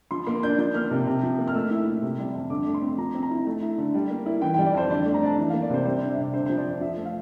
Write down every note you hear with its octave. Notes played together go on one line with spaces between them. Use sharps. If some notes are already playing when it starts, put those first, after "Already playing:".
F3 C6
A#3 C6
D4 G6
F3 G6
A#3 F6
C3
C3
F3
A#3
F6
A3 E6
E4
A#2
C3
G3
F2
D3 D6
A3
C6
C4
F3 A#5
C4
A#5
E4
A3
E4
D3
G3
A#3
E4
E3 G5
G5
G3
D5
F2 C5
D3 D5
A3
A#5
D4 A5
E3
F5
A#3
D5
C3 C5
G3 C5
D5
D4
E5
C3 D5
D3 C5
F3 C5
D5
F2
F3 E5
A3
F5